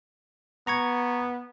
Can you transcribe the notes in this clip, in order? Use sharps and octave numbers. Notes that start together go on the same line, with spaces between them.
B3 A#5 C#6 G#6